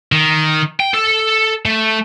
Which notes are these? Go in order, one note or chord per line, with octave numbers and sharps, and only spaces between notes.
D#3
G5
A4
A3